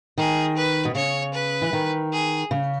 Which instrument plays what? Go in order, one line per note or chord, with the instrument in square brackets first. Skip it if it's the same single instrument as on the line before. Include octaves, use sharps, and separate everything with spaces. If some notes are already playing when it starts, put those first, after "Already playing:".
[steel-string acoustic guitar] D#3 [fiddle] G#4
[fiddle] B4
[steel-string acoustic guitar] B2
[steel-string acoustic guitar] C#3 [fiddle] C#5
[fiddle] B4
[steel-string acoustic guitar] E3
D#3
[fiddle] G#4
[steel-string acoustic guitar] C#3